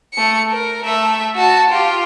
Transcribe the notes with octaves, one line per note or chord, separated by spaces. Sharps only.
A3 C#7
A#4
A3 E5
F#4 A5
F4 G4